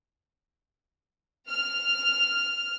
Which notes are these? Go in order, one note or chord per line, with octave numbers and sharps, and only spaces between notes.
F6